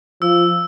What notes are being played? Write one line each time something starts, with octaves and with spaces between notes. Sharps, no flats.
F3 E6